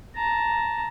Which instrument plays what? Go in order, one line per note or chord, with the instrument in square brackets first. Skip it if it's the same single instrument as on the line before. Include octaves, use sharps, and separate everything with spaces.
[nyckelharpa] A5 A#5